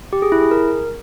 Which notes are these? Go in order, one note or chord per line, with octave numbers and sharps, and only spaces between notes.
G4
G#4
E4
G#4
A#4